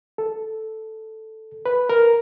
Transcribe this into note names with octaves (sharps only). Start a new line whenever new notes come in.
A4
B4
A#4